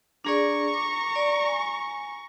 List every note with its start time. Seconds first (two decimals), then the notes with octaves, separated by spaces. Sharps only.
0.25 D4 G#4 D5 A#5 C#6
0.74 D6
1.16 D5
1.46 G#5